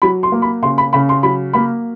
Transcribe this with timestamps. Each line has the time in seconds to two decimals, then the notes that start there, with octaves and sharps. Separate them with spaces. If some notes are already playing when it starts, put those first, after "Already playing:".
0.02 F#3 B5
0.23 C6
0.32 A#3
0.42 B5
0.62 C#3 C6
0.78 B5
0.93 C#3 B5
1.09 C6
1.23 F#3 B5
1.53 A#3 B5